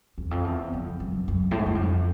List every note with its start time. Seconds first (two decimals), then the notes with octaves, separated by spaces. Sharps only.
0.18 E2
0.31 F2
0.44 E2
0.74 F2
1.00 F#2
1.28 F#2
1.51 A2
1.59 G#2
1.66 G2
1.75 F#2
1.83 F2